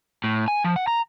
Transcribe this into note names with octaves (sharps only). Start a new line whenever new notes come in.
A2
G#5
F3
F#5
A#5